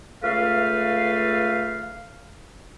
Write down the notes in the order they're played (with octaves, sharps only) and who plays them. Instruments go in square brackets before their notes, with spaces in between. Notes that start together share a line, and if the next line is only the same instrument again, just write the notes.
[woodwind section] C#2 A3 A4 B4 F5